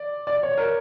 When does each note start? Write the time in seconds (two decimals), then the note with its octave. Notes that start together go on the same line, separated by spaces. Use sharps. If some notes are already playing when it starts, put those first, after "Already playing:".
Already playing: D5
0.27 D5
0.43 C#5
0.57 A#4